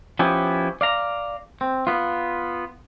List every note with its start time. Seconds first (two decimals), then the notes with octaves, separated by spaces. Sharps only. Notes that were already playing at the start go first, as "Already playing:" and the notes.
0.19 F3 B3 C#4 E4 G4
0.81 D5 F5 A#5
1.61 C4
1.87 B3 F4